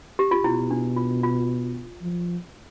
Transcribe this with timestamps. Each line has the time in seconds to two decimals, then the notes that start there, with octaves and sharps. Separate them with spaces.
0.19 G4
0.31 F4
0.44 B2 E4
0.70 D4
0.97 F4
1.23 F4
2.02 F3